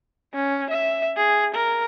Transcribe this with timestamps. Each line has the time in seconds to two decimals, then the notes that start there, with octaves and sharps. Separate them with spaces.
0.34 C#4
0.71 E5
1.17 G#4
1.55 A#4